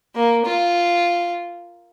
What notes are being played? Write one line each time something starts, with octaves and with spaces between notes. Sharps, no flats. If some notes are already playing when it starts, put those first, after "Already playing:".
A#3
F4